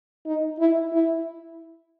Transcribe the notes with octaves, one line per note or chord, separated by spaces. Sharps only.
D#4
E4
E4